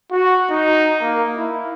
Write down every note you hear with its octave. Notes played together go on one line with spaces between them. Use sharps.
F#4
D#4
A#3
E4